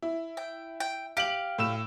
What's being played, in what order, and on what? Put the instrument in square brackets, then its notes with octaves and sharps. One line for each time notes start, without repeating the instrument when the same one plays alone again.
[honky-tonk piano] E4
[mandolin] G5
G5
[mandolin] G4 F5 [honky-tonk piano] D7 F#7
[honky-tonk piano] A2 E6 E7